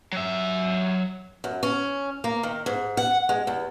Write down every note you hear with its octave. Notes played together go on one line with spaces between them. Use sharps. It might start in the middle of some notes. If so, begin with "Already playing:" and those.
F#3 E5
F#2
C#4
A#3
D#3
G#2
F#5
G#3
E2